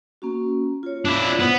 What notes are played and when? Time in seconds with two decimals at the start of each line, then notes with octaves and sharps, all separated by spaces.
0.22 A#3 C#4 F#4
0.83 F4 C#5
1.05 D4 E4
1.40 B3 C5